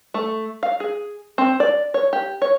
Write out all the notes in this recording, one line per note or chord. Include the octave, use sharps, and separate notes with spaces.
A3
F5
G#4
C4
D5
C#5
G4
C#5